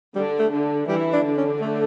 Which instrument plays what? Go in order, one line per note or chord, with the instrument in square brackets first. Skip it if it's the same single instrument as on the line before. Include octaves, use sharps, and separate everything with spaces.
[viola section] D3 D4 [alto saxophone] G3
[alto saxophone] A3
[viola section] D3 D4
[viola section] E3 E4 [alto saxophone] G3
[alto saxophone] D4
[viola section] D3 D4
[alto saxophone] C#4
A3